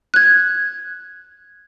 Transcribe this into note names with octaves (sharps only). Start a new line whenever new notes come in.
F#6 G#6